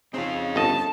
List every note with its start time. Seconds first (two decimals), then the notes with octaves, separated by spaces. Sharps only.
0.14 C#3 C4 D#4 F4
0.56 G1 D#5 A5